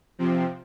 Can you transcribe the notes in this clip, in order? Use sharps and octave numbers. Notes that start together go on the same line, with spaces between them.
C3 F3 C4